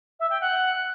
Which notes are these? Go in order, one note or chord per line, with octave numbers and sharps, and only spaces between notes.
E5
G5
F#5